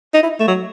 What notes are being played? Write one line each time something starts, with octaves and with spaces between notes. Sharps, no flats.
D#4
E4
A3
F#3